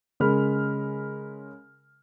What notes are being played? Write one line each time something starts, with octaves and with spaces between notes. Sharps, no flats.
C#3 G#3 A#4 B5 F6